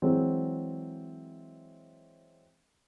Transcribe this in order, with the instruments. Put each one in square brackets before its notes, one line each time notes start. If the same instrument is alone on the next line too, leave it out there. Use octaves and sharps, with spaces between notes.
[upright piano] E3 F#3 G#3 C4